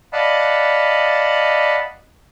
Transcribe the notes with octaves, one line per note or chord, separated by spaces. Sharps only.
D5 D#5 F5 F#5 A5 B5